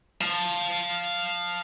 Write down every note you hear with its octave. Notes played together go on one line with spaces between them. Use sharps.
F5 A5